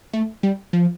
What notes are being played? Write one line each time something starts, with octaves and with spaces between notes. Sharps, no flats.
A3
G3
F3